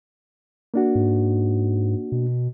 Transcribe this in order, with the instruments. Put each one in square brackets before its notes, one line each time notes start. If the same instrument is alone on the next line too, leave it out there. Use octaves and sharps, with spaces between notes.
[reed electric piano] A#3 D4 F#4
[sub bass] G#2
B2